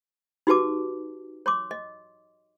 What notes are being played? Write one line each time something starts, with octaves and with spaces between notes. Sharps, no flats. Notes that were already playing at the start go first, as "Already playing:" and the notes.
D#4 F#4 G4 B4 A5 D6
C#5 C6 D6
D#5